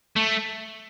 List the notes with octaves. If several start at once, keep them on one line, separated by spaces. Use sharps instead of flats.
A3